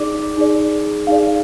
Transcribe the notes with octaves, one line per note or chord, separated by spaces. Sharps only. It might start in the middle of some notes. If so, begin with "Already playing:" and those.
Already playing: D#4 G#4 D5 D6
D#4 G#4 D5
D#4 G#4 D5 F5